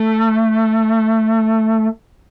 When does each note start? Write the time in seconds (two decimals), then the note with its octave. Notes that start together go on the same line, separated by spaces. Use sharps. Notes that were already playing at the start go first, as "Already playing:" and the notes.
Already playing: A3